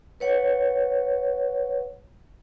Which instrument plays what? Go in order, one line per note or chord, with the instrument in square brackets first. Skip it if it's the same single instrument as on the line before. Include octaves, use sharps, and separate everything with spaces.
[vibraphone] B4 C#5 F#5